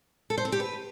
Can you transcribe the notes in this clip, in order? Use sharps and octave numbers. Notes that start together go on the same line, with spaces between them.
A4
C5
C4
G4
B4